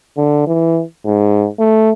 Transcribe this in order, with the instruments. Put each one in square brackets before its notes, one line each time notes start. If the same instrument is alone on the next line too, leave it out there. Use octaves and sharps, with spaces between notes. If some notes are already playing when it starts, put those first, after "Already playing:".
[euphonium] D3
E3
G#2
A3